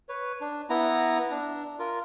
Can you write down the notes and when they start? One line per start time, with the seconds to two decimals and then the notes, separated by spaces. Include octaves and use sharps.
0.09 B4 C#5
0.41 D4
0.70 B3 E4 A#5
1.31 D4
1.79 F4 A#4